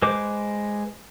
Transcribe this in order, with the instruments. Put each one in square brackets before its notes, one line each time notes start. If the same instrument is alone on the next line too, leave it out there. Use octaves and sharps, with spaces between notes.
[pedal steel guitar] G#3 B4 C5 D6